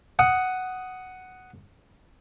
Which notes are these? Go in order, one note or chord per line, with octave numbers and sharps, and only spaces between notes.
F#5 D#6